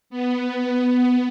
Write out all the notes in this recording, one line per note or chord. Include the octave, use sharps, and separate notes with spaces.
B3